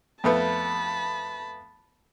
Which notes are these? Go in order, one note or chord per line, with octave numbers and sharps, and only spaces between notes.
F2 A3 B3 A5 B5